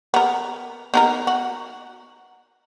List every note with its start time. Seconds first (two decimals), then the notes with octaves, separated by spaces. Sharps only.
0.14 B3 A#4
0.94 B3 D#4 A#4
1.27 F#4